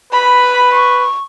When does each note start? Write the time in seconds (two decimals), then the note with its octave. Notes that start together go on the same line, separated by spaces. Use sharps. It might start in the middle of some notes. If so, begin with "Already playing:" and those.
0.13 B4 B5
0.73 C#6